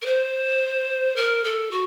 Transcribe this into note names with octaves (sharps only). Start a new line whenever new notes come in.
A#4
C5
A#4
A4
F#4